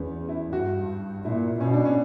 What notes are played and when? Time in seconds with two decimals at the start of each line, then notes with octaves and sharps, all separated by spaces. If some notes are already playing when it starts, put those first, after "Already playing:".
Already playing: E2 B3 C#4
0.29 E4
0.52 G2 F#4
1.25 A#2 E4
1.60 B2 C#4
1.73 D4
1.85 C#4